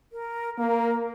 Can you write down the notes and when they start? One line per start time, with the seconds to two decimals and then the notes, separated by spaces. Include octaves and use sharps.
0.12 A#4
0.58 A#3 A#4